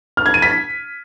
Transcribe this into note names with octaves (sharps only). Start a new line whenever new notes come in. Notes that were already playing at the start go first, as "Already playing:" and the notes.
F6
G#6
D#7
B6